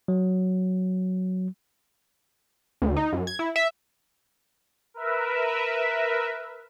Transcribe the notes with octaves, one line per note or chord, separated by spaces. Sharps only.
F#3
D2
D#4
F#2
G#6
E4
E5
A#4 B4 E5